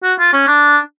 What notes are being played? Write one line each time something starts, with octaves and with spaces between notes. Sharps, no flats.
F#4
F4
C#4
D4